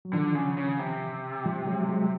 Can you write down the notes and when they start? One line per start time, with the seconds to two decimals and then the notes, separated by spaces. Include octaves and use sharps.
0.05 F#3
0.13 D3 D#3 F3
0.35 C#3
0.58 C#3
0.79 C3
1.46 F3 G3
1.67 F#3 G#3
1.89 F#3 G#3